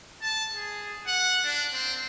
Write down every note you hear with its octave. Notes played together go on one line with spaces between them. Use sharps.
A5
G#4
F#5
D4
C4